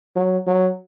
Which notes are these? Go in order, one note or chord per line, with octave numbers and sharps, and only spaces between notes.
F#3
F#3